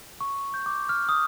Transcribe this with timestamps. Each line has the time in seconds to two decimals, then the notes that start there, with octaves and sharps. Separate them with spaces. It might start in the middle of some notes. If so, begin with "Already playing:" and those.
0.21 C#6
0.54 G6
0.66 D6
0.89 F6
1.09 D#6